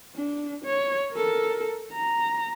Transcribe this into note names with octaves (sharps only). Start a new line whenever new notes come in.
D4
C#5
A4 A#4
A#5